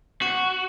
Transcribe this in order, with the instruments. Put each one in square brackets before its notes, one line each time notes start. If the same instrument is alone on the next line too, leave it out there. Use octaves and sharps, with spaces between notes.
[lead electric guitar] F#4